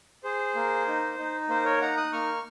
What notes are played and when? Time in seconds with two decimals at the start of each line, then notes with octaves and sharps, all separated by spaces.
0.24 G#4 C5
0.56 A#3
0.88 D#4
1.18 D#4
1.49 A#3 C5
1.65 A#4 C#5
1.81 D#4 F#5 A#5
1.97 D#6 F#6
2.13 A#3 C#6 F6